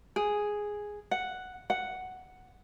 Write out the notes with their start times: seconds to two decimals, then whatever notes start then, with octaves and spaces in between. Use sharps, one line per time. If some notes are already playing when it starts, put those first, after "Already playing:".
0.16 G#4
1.11 F#5
1.70 F#5